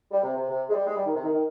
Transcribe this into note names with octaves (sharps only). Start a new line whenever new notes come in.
G3
C3
C3
C3
G#3
G3
G#3
G3
D#3
C3
D#3
D#3